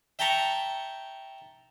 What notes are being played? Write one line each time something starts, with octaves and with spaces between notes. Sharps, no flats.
E5 G5 A5 A#5 C#6